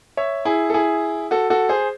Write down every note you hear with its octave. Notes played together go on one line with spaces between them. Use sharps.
C#5 E5
E4 G#4
A4
E4 G#4
F#4 A4
F#4 A4
G#4 C5